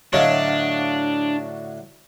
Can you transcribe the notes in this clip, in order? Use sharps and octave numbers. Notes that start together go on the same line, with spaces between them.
A2 D3 F#3 D4 C#5 D#5 F5